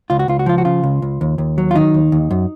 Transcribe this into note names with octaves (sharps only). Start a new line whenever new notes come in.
C#2 F4
F#4
C#2 F4
F#4
F3 F4
F#4
C#3 F4
C#2
C#2
D#2
D#2
F#3
F4
D#3 D#4
D#2
D#2
F#2